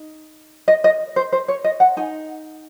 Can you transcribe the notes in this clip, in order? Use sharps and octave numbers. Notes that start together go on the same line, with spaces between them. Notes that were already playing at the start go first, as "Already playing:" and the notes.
Already playing: D#4
D#5
D#5
C5
C5
C#5
D#5
F#5
D#4 G#5